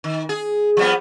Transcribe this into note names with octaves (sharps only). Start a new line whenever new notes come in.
D#3
G#4
F3 G3 B3